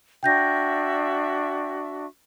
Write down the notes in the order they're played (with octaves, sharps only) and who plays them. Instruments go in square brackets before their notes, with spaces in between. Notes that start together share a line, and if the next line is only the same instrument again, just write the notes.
[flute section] D4 F#4 E5 [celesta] G5 G6 A#6